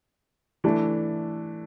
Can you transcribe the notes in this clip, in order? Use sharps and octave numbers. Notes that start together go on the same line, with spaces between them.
E3 A3 D4